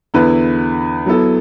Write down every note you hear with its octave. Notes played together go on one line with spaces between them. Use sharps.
E2 D3 B3 E4 B4
F#3 B3 E4 A4